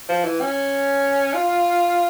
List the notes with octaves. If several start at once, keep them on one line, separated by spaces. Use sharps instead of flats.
F3
E3
C#4
F4